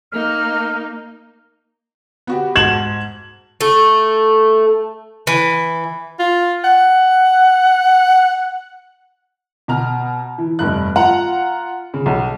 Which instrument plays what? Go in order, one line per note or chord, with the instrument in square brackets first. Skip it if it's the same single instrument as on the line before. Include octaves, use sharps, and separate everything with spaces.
[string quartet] A#3 D#4 [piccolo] F6
[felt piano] B3 F#4 G4
[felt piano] G#2 F#4 A5 [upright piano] G#6 E7 F#7
[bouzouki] A3
E3
[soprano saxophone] F4
F#5
[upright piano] B2 A#5 F6
E3
F1 G2 F#6
F4 F#5 A#5
C#3
B1